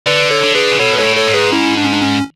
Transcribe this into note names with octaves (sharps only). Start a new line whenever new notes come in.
D3 B4 D5
A4 C#5
D3
G#4 B4
C#3
B2 A4 C#5
B4
G#2 A4 C#5
A2
A4 C#5
G#2
G#4 B4
C#4 E4
D4
C#4
D4
C#4